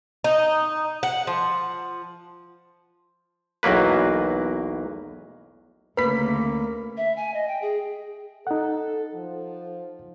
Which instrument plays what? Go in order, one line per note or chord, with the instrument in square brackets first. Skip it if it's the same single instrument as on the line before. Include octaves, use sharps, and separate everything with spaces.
[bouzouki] D#4
F#5
F3
[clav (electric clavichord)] B1 E2 F#3 A#3 B4
[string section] D2 C#3 [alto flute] A#3 [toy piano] B4 [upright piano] B5 B6
[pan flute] E5
G#5
D#5
G5
G#4
[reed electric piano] D#4 F#5 [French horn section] A4
[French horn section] F3